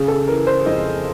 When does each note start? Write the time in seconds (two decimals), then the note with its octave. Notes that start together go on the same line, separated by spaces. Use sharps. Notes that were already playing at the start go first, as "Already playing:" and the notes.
Already playing: C#3 G#4
0.08 A4
0.28 E3 A#4
0.47 C5
0.66 F2 D#5